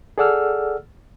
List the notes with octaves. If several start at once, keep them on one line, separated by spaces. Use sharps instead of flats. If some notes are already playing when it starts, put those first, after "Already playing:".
G#4 A4 D5 F#5 E6 F6